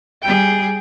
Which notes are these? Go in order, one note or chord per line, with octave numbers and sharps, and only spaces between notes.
G3 G#4 G5